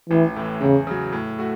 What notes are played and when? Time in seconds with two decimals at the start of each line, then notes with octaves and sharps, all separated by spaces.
0.10 A1 E3
0.36 A2 E3
0.61 E2 C#3
0.87 C#3 F#3
1.12 A2
1.39 A3 F#4